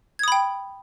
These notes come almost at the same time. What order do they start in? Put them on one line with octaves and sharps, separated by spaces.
G#6 D#6 B5 G5